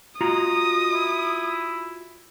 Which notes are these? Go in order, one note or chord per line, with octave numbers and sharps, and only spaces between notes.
F4 F#4 D#5 A#5 D#6
E4